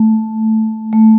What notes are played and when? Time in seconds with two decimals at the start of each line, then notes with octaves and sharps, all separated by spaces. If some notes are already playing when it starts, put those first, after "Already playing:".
Already playing: A3
0.93 A3